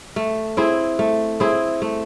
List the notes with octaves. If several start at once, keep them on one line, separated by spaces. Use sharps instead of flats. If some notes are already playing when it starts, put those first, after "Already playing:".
A3
C4 E4 G#4
A3
C4 E4 G#4
A3